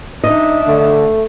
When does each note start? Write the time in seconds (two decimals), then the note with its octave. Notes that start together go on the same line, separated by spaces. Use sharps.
0.24 D4 D#4 D#5 E5
0.67 D3 A3